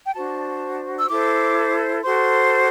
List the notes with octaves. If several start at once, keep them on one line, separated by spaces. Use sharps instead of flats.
G5
D4 F#4 C5 A5
E6
E4 A4 C5 D6
F#4 A4 C5 C6